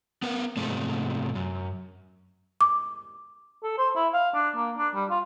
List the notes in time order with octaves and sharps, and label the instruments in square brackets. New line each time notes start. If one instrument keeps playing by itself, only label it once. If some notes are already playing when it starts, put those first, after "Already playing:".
[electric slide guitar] B3 A#4 B4
G#2 C3 G#3 A3
F#2
[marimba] D6
[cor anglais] A4
C5
E4
F5
D4
A#3
D4
G3
F4